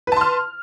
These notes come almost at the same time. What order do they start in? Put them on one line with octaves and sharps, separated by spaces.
B4 A5 C6 F6